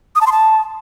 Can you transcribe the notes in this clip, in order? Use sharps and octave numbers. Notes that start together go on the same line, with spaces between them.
D#6
A5
C6
A5